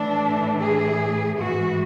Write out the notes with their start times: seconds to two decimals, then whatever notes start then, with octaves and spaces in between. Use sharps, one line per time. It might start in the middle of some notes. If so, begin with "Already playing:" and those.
Already playing: A2 E3 D4
0.59 G#4
1.37 G#2 E3 F#4